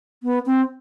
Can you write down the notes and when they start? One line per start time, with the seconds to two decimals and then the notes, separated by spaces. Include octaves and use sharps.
0.23 B3
0.46 C4